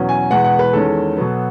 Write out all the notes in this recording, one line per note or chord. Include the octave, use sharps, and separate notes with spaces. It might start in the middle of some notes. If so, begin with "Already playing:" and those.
Already playing: E2 B2 F#3 C#4
G#5
E2 B2 G#3 B3 F#5
F#5
B4
E2 D#3 G#3 C#4 A4
B2 F#3 B3